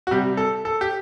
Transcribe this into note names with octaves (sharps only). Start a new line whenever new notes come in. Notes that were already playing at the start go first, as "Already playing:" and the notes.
F#4
C3 G3 G4
A4
A4
G4